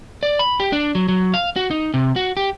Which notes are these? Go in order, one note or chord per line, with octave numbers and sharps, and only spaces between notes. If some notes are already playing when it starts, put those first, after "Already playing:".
D5
B5
G4
D4
F#3
F#3
F5
F#4
D#4
C3
F#4
G4